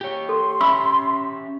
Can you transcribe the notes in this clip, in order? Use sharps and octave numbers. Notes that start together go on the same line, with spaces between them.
G4 C#5
A4 C6
C#4 G4 E5 B5 C#6 E6